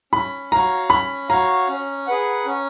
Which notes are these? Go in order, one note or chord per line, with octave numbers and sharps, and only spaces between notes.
C#4 B5
F#4 C#5 F5 A#5
C#4 B5
F#4 C#5 F5 A#5
C#4
G#4 B4 F#5
C#4